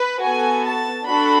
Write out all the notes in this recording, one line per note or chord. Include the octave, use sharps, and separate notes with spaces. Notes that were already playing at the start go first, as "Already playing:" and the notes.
Already playing: B4
B3 F#4 A4 G#5
A5
D4 F#4 A4 B5